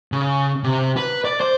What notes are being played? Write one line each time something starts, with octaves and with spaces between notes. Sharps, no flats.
C#3
C3
B4
D5
C5